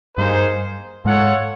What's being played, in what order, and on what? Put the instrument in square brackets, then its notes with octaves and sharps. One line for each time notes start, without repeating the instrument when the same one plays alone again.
[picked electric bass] G2 G3 [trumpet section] A#3 D#4 G#4 C5
[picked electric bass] G#2 G#3 [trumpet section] F4 A4 C#5 F#5